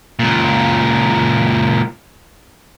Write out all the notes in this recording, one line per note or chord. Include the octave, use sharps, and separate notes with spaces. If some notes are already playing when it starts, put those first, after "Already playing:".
C#2 A#2